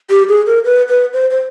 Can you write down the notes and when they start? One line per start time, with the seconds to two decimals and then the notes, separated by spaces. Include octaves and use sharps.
0.10 G4
0.29 G#4
0.46 A#4
0.65 B4
0.89 B4
1.13 C5
1.30 C5